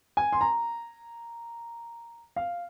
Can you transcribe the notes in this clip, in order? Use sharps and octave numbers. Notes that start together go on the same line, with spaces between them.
G#5
C6
A#5
F5